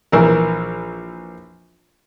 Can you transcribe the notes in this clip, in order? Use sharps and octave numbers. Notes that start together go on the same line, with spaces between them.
A#1 E3 A#4